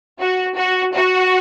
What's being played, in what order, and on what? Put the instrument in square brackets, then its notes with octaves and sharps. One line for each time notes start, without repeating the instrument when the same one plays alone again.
[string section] F#4
F#4
F#4